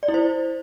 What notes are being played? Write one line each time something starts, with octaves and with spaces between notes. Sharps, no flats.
D5
E4
C5